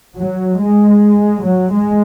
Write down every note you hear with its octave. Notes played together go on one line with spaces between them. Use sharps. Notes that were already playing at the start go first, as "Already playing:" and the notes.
F#3
G#3
F#3
G#3